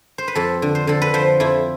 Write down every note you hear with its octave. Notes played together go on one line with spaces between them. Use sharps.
C5
B4
F2 A4
D3
C5
D3 A4
B4
F3 C5
F2 E4